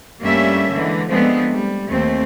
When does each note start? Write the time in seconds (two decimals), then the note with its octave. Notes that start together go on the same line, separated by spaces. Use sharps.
0.21 G2 G3 A3 A#3 C#4 E5
0.72 D3 E3 G#3
1.09 F3 G#3 A3 B3 C4 D4
1.51 G3
1.88 D#2 A3 C4